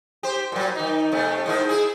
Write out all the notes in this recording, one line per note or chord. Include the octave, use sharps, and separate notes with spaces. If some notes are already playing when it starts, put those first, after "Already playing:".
G4 C5
A#2 F#3
D#3 D#4
C3 A3 B3
G#2 D#3 E4
E4 G#4